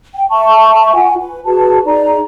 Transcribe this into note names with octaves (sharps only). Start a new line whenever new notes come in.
G5
E5 A5 C#6
F4 F#5 G#5
B4
F#4 G#4 B4 A5
D#4 G#4 D5 A#5